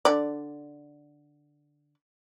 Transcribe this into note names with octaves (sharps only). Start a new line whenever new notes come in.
D3 D5